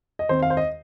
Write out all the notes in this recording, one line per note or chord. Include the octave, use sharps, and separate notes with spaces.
D#5
D#2 D#3 C4 C5
F5
C5
D#5